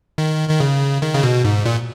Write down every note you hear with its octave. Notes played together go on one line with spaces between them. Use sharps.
D#3
D#3
C#3
D#3
C#3
B2
G#2
A#2